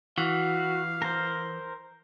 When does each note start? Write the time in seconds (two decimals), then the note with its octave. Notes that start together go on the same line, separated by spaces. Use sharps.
0.18 E3 F#4 F5
1.02 A#4 C5